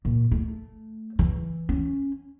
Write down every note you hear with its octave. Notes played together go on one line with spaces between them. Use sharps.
A#2
A3
E3
C#4